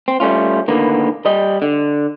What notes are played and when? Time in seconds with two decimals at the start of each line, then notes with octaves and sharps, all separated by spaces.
0.08 C4
0.20 G3 A3 C#4 F4
0.68 A2 D3 D#3 A#3 B3
1.25 G3 D#5
1.62 D3